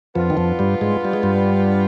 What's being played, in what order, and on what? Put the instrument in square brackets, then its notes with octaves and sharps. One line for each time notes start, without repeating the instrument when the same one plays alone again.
[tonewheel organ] F2 F3 [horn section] B3 D4 F4
[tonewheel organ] D#3
F2 F3
G2 G3
G#2 G#3
G3
G#3
G2 G3